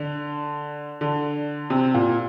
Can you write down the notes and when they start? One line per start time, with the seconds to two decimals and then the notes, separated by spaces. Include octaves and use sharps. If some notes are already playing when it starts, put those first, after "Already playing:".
Already playing: D3
1.01 D3
1.70 C3
1.94 A#2